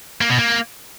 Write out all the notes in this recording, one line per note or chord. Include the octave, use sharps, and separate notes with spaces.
A#3
B2
A#3